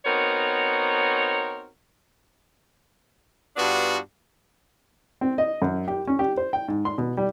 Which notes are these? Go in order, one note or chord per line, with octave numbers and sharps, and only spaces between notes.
B3 C4 D#4 F#4 A#4 C#5
G2 B3 D4 F4 F#4
C4
D#5
F#2
G4
C#4
G4
C5
G5
G#2
C6
B2
G3